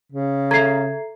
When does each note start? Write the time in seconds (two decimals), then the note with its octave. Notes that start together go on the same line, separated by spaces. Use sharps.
0.12 C#3
0.51 A4 E5 A#5 G#6 C7